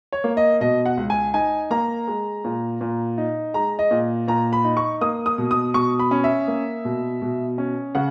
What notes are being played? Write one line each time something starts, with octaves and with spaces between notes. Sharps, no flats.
C#5
A#3
D#5
B2 D#5
F#5
C#2
G#5
D#4 G#5
A#3 A#5
G#3
A#2
A#2
D#4
G#3 A#5
D#5
A#2
A#2 A#5
B5
D#4
C#6
A#3 D#6
D#6
B2
D#6
B2 C#6
B5
C#4
E5
A#3
B2
B2
C#4
C#3 F#5